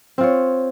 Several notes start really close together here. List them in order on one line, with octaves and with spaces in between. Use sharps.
C4 F4 C#5